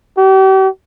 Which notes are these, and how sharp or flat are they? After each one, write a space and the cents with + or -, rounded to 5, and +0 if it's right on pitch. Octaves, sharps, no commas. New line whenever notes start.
G4 -40